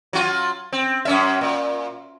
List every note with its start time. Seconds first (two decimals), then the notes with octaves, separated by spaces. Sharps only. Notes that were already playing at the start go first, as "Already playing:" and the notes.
0.13 F#3 F4 F#4
0.72 C4
1.05 F#2 C#4 E5
1.41 A#2